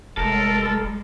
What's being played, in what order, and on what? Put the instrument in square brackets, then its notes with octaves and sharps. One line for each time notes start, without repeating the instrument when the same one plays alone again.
[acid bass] F1 [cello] G3 G#3 [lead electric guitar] A4 [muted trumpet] A#4